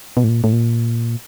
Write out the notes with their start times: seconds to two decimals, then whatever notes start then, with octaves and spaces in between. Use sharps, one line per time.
0.17 B2
0.24 A2
0.29 A#2
0.44 A2
0.53 A#2